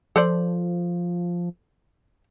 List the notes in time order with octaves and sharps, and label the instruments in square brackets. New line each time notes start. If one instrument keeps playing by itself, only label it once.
[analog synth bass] F3 [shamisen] A4 C5 D5